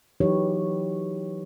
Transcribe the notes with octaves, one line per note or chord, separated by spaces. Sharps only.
E3 F#3 D#4 G4 B4 C#5